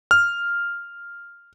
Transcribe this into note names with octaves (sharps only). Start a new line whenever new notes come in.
F6